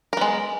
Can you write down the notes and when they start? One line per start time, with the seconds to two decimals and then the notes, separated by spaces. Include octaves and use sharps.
0.13 A#4
0.17 B3
0.21 G#3